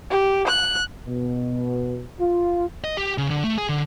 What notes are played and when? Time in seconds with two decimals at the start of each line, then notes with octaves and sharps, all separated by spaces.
0.11 G4
0.48 F#6
1.06 B2
2.20 F4
2.84 D#5
2.97 G4
3.18 C#3
3.30 D3
3.44 A3
3.58 G#4
3.69 D3